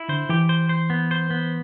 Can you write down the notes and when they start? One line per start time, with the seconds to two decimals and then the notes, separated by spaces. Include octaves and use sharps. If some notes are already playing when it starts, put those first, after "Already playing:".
Already playing: E4
0.09 D3 C5
0.29 E3 G4
0.49 C5
0.69 C5
0.90 B3
1.11 C5
1.30 B3